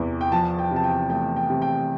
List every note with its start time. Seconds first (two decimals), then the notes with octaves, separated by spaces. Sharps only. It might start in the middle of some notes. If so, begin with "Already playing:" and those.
Already playing: E2 C3 E3
0.21 G5
0.32 F3 A5
0.59 G5
0.71 C3 A5
0.84 G5
1.10 A3 G5
1.36 G5
1.50 C3
1.62 G5